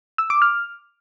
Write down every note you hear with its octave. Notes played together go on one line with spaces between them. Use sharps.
E6
D6
F6